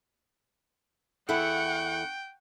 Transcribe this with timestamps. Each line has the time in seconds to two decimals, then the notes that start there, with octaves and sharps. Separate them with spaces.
1.29 E2 E4 A4 F#5 G5 C#6